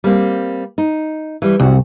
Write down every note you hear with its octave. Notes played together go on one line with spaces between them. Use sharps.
G3 A#3 C4
D#4
E3 G3
C2 F#2 F#4